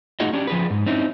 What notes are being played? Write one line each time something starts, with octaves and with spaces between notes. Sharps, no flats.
A3 D#4 F4 F#4 G#4 D#5
C#4 D4 G4
F3 G#4 B4
G#2
C4 C#4 D#4 E4